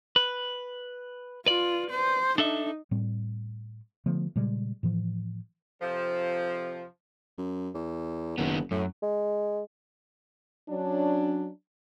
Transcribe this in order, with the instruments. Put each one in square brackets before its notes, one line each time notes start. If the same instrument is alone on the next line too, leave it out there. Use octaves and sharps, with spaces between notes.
[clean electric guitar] B4
[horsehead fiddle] F4 [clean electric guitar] B4 D5
[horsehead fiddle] C5
[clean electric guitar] D4 A4 E5 [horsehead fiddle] D#4
[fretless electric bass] A2 G3 C4
D3 F3 A3 B3
A#2 C#3 G3 G#3
A2 E3 F3
[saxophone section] F2 C3 F3
[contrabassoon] F#2
E2
[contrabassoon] F#1 [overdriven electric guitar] D#3 B3
[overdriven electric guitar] F#2 [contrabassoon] A2
[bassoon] G#3
[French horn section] F#3 C#4 D4